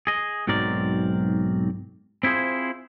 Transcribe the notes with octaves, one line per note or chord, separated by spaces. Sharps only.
G#4 D#5
B1 G#2 F#3 C4 A#4 D5
C4 E4 F4 G#4 C5